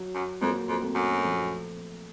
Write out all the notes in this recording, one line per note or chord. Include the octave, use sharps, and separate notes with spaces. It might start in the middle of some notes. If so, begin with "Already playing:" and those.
Already playing: F#3
F#2
F2 F#3 A#3
F2
A3 C4
F#2
F3 A3